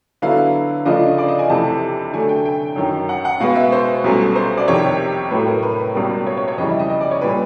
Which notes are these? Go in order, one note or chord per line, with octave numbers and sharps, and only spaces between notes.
D3 F#3 B3 E4 F5
C#3 F3 A3 D4 F4 D#5
D5
D#5
G#5
F2 C3 E3 A3 C4 A5
D3 F#3 A3 G#5
G5
G5
F#2 D#3 F#3
F#5
F#5
B2 G#3 B3 F5
E5
C5
C2 B2 F#3 A3 C#4
C5
D5
F2 C3 D#3 C#5
A2 F#3 A3 B4
A#4
B4
C#2 B2 G3 A#3
C#5
C#5
C#5
F2 C#3 E3 G3 D#5
E5
D#5
D#5
D5
C#5
A#2 G3 B4